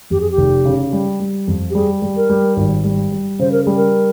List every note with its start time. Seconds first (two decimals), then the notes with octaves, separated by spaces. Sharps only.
0.10 F2 G4
0.20 G#4
0.31 G4
0.37 F1
0.65 C#3
0.93 G3
1.20 G3
1.47 F2
1.70 G4
1.75 G3 G#4
2.02 G3
2.16 A#4
2.30 G3
2.57 G#1
2.84 G3
3.12 G3
3.39 C#3 C5
3.51 A#4
3.64 G3 G#4
3.75 A#4